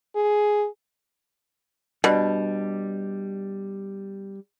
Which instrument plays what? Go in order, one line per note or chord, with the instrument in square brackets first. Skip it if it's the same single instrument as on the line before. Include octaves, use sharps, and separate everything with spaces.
[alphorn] G#4
[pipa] B2 [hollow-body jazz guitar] G3 D4